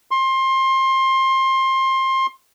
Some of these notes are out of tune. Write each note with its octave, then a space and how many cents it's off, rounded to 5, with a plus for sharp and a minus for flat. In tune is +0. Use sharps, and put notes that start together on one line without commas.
C6 +25